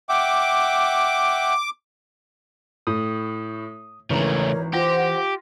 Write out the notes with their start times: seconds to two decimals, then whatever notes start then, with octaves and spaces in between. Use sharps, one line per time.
0.09 E5 F#5 G5 D6
2.87 A2 D#6
4.10 G#1 C#3 E3 A3 A#4 C#5 A#5
4.73 F4 G4 C5 F#5 A#6